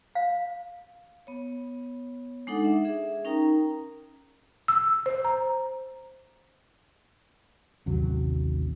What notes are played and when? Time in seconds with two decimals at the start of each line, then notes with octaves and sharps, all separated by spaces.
0.15 F5
1.27 B3 C#5
2.47 G#3 D4 D#4 A4 F#5 D6
2.64 E5
2.85 G#4 E5
3.25 C#4 D#4 A#4 G5 A#5
4.68 E6
5.06 C5
5.25 A#5
7.86 A1 D#2 C3 F#3